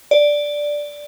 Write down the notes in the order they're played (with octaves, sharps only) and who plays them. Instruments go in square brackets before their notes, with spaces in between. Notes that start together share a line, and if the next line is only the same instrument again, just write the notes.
[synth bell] D5